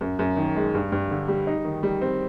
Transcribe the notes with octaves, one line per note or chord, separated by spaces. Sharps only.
F#2
F#2
D#3
G#3
G2
G2
D3
G3
D#4
D#3
G3
C4